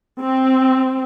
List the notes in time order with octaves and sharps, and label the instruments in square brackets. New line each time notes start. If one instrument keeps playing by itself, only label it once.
[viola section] C4